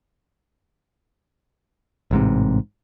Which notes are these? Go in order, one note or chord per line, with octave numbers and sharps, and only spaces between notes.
A1 G#2 C3